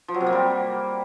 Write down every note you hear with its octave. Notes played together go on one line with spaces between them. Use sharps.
F3
F#3
C3
A#3
G3